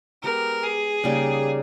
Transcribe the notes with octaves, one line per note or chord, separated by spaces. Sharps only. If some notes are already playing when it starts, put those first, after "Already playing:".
G#3 B3 G4 A#4
G#4
C#3 G3 A#3 D#4